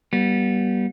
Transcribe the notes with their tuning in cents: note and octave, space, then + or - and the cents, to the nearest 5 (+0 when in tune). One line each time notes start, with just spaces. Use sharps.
G3 -20 B3 -35